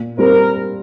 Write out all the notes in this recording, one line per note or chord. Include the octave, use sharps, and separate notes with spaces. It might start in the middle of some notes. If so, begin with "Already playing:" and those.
Already playing: A#2
G3 C4 A#4